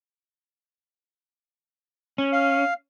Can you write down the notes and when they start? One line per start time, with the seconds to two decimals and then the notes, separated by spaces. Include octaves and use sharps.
2.18 C#4
2.32 F5